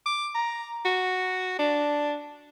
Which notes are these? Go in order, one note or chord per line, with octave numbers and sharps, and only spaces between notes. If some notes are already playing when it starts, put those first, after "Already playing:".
D6
A#5
F#4
D4